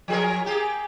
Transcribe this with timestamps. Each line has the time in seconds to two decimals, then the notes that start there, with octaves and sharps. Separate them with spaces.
0.08 F3 G#4 A#4
0.44 A#3 G4 G#4